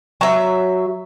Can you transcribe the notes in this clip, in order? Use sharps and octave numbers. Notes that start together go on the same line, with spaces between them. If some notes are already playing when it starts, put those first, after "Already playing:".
F#3 E5